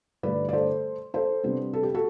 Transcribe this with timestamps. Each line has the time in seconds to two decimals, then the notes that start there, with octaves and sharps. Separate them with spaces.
0.23 G2 D3 A3 D4 B4 D5
0.49 D5
0.53 A4 C5
1.14 A4 C5
1.43 C3 G3 B3 D4
1.73 A4
1.83 G4
1.94 F#4 A4